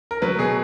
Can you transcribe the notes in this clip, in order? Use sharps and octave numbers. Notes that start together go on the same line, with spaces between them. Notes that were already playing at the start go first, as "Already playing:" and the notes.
A#4
F#3 B4
B2 G#4